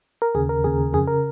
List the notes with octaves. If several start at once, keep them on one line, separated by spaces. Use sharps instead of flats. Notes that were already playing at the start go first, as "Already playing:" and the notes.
A#4
D#2 C#3 G#4
A#4
D#2 C#3 G#4
F2 C#3 G#4
A#4